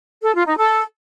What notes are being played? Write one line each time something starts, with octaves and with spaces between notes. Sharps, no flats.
A4
F4
D#4
A4